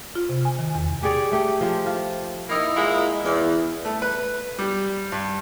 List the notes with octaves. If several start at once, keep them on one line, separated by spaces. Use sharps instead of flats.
F4
C3
G#5
D#3
E2
G4 G#4 C#5 D5
A3 G4
F3 C5
F4
A#3 D#4 E4
A#2 G#3 A#3 E4
E2
A3
B4
G3
G2